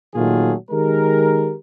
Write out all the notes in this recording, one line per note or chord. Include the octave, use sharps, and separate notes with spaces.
A#2 D#3 F#3 A3 F4 G#4
D#3 G#3 G4 A#4